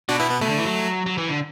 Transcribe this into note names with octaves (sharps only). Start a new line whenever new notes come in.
B2 D4 F#4
B3 E4
B3
B2 A3
D3
E3
F#3
F#3
E3
D3